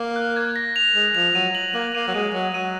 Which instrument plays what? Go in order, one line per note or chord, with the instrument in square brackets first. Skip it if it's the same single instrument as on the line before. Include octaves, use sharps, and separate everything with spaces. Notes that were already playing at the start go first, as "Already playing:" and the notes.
Already playing: [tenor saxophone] A#3
[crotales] F#6
G#6
A#6
F7
[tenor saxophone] G#3
[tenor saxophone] F3 [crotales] F7
[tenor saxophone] F#3 [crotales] D#7
[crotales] F#7
[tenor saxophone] A#3 [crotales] F7
[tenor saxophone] A#3 [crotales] D#7
[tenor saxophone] F#3
[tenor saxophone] G#3 [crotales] D#7
[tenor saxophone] F#3
[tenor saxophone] F#3 [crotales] D#7